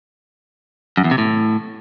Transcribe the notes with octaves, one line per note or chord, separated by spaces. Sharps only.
F#2
E2
C3
A2